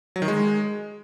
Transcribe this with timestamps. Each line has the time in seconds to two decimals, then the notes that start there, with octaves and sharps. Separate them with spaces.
0.16 F#3
0.22 D#3
0.28 G#3